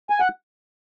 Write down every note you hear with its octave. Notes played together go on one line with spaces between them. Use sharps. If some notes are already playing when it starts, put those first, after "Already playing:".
G#5
F#5